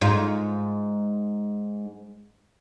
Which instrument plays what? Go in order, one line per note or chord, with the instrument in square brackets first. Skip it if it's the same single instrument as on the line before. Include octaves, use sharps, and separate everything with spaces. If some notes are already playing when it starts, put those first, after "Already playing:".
[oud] G#2 D#4 F4